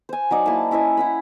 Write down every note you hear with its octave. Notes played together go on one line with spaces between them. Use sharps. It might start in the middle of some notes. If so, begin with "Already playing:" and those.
C5 G#5
F#3 D#4 D5
A#3 E4 A5
C#4 E4 D#5 G#5
E4 F#5 B5